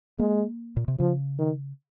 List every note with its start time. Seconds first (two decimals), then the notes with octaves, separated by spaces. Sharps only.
0.19 G#3 A#3
0.77 A#2
0.88 C3
0.99 C#3 F3
1.38 D#3